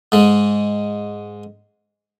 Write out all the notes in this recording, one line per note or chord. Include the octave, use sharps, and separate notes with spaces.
G#2 G#3